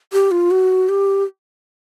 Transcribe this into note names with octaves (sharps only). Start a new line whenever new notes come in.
G4
F4
F#4
G4